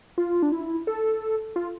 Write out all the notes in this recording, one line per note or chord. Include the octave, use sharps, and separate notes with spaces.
F4
D4
E4
A4
F4